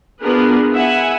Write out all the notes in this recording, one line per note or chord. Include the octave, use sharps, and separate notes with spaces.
B3 D4 F4 G#4 A#4 B4
E4 E5 F#5 G#5